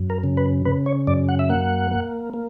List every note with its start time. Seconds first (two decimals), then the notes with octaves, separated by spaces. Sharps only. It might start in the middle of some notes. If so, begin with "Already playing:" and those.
Already playing: F#2
0.10 A#4
0.24 C#3
0.37 B4
0.65 C#3 B4
0.86 C#5
1.07 F#2 D5
1.29 F#5
1.39 E5
1.49 A#3 F#5
1.91 A#3
2.34 A#3